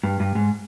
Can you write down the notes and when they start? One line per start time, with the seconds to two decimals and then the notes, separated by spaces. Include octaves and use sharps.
0.03 G2
0.20 G2
0.35 G#2